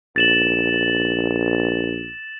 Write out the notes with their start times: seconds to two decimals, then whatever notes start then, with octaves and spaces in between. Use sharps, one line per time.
0.16 A#1 A6 E7 F#7